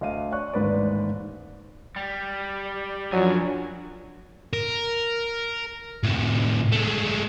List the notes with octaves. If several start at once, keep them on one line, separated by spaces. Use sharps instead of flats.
D2 D#5 F5 D#7
C#5 D5 C#6 F#6
A1 D#2 G#2 B4 C5 D5
G3
C2 F#2 F3 F#3 D4 G#5
A#4
A2 C3
G#3 A3